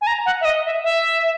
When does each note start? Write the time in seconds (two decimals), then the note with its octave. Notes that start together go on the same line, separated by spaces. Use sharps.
0.01 G#5
0.07 A#5
0.26 F#5
0.41 E5
0.45 D#5
0.65 E5
0.84 E5